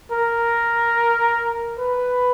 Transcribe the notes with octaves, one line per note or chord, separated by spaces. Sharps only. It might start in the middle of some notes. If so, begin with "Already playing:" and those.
A#4
B4